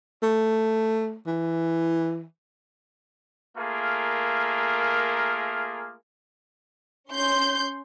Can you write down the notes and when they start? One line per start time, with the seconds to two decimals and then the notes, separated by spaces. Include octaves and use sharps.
0.23 A3
1.27 E3
3.57 A3 A#3 F4 G#4 A#4
7.09 C#4 C6 G6